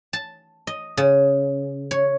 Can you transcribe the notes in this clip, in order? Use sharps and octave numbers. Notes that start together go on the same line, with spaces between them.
A5
D#5
C#3
C#5